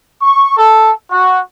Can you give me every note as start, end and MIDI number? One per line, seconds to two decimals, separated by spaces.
0.22 0.54 85
0.57 0.91 69
1.11 1.38 66